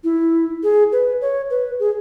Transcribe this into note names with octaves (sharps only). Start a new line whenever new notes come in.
E4
G#4
B4
C#5
B4
G#4